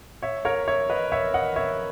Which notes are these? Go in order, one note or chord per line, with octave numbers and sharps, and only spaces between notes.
C#5 E5
A#4 C#5
C#5 E5
B4 D#5
C#5 E5
D#5 F#5
C#5 E5